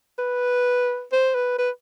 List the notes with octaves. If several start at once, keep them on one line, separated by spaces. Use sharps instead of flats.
B4
C5
B4
B4